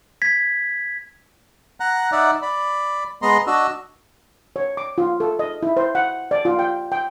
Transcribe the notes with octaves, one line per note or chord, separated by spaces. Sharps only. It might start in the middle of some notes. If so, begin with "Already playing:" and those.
G#6 B6
F#5 A#5 F#6
D#4 D5 E5 F#5
D5 B5
G#3 B3 D#5 A#5 C6
D4 F#4 D#5 E6
C#5
D6
F4
A4
D#5
E4
C5
F#5
D5
F4
G5
G5